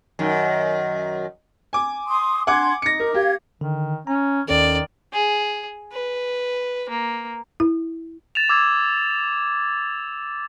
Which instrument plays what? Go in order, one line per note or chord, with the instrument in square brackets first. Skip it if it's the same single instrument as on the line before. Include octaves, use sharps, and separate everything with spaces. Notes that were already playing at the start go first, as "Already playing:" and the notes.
[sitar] F#2 D#3
[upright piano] G#5 D6
[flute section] C6 D#6
[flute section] D4 C6 G#6 [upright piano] F#5 G#5 D6
[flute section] D#4 [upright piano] A#6 C#7
[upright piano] A#4
[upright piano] G4 [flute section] F5 G#6
[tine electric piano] D3 [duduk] D#3
[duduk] C#4 [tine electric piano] A#5
[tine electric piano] D#2 C#4 A4 [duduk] D#3 [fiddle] D5
[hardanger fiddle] G#4
B4
A#3
[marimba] E4
[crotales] A6 E7 F7
D6 E6 G#6